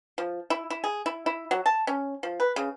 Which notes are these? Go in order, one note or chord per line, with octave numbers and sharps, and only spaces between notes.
F3
E4
E4
G#4
E4
E4
F#3
A5
C#4
F3
B4
C#3